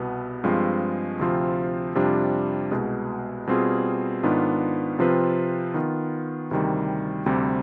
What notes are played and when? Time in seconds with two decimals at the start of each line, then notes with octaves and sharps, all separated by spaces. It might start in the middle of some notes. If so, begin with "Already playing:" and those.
Already playing: C2 B2 B3
0.44 G2 F3 G#3 C4 F4
1.19 D2 C3 F3 C4 F4
1.95 F2 C3 G3 D4 F4
2.71 C2 B2 G#3
3.47 B2 G3 C4 F4 G#4
4.23 G#2 D#3 B3 D4 F4
4.99 C3 F3 C4 F4 B4
5.74 D#3 B3 F4
6.51 D2 C3 D#3 G3
7.26 D2 C3 G3 C4 G4